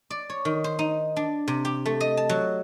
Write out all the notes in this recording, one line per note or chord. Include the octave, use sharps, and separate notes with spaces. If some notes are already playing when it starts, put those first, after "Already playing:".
D5
C#5
D#3
C5
D#4
D4
C3
G4
A3
D#5
A5
F#3